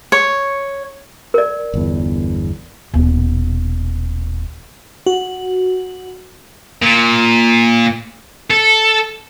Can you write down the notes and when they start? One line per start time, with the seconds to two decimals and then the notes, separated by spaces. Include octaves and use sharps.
0.12 C#5
1.34 A#4 D5
1.74 G1 E2
2.94 D#1 B2
5.06 F#4
6.82 A#2
8.50 A4